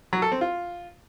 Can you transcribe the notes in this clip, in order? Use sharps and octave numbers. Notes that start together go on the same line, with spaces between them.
F#3
A4
C4
F4